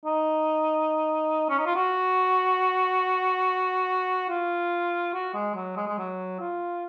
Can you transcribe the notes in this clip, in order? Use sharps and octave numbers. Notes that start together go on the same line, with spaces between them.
D#4
C#4
D#4
F4
F#4
F4
F#4
G#3
F#3
G#3
G#3
F#3
F4